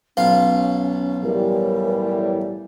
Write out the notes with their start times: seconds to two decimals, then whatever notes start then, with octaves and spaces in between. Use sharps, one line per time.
0.17 B1 C#4 F4 F5
1.23 A2 E3 G3 A#4